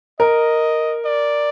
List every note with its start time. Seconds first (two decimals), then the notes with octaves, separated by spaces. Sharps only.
0.20 A#4 D#5
1.05 D5